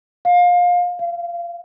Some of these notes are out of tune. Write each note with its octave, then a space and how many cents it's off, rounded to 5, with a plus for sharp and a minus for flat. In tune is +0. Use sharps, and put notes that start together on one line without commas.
F5 +25
F5 -25